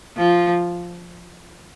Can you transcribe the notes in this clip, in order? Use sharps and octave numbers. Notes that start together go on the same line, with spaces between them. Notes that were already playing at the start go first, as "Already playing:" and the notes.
F3 F4